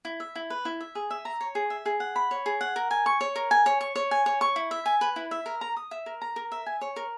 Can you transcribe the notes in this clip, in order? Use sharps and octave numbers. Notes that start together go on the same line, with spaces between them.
E4
E5
E4
B4
E4
E5
G#4
E5
A#5
C#5
G#4
E5
G#4
F#5
B5
C#5
G#4
F#5
A#4
G#5
C#6
C#5
A#4
G#5
C#5
C#6
C#5
G#5
C#5
C#6
E4
E5
G#5
B4
E4
E5
A#4
A#5
D#6
E5
A#4
A#5
A#4
E5
G#5
C#5
A#4